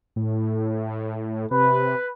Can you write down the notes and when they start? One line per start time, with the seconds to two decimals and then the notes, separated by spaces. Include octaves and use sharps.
0.16 A2
1.51 C3 B4